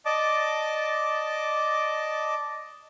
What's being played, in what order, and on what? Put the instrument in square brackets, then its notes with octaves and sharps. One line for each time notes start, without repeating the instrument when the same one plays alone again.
[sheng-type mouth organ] D5 D#5 A5 D6